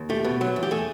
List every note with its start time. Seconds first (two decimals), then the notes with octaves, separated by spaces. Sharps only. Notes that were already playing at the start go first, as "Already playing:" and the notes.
Already playing: D#2
0.10 A3 G4
0.24 B2
0.41 F#3
0.56 E2
0.63 G4
0.71 A3 G#4